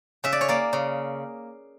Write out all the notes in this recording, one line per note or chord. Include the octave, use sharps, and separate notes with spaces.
C#3 E5
D5
C#5
A#3 D5
C#3